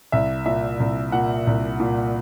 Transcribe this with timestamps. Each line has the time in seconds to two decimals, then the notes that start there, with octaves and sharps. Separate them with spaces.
0.12 C2 E5
0.46 A#2 E5
0.80 C2
1.12 A#2 F#5
1.47 C2
1.80 A#2